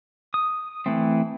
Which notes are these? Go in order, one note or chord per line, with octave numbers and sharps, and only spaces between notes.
D#6
E3 A3 C4